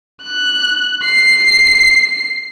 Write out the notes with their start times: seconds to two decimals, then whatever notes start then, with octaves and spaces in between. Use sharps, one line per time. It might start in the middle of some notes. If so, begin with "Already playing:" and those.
0.22 F#6
1.04 C7